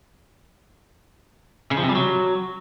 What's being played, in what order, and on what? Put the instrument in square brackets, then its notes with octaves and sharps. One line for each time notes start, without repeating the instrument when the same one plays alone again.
[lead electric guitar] C#3
F3
C3
G3
F#3